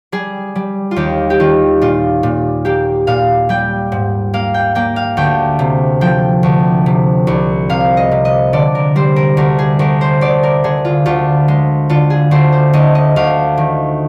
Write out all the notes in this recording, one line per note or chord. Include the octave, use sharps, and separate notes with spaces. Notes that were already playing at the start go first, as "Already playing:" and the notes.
G3 G#4
G3
F4
D#2 G4
G4
D#3 F4
A#2 F4
A#2
A#3 G4
A#2 F5
G3 G5
G#2
A#3 F5
G5
A#3 G5
F5
D2 G5
C3
F3 G5
D2
C3
C2
C3 F5
D#5
C3
D#5
D3 D5
A#4
G3 C5
A#4
D2 A#4
G#4
D2 A#4
C5
D2 D5
A#4
D3 G#4
F4
D2 F4
G#3
D3 F4
G#4
D2 C5
C5
D2 D#5
D#5
D2 F5
D#3